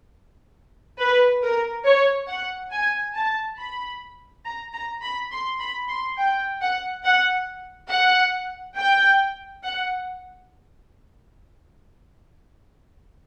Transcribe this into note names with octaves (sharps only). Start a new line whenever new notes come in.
B4
A#4
C#5
F#5
G#5
A5
B5
A#5
A#5
B5
C6
B5
C6
G5
F#5
F#5
F#5
G5
F#5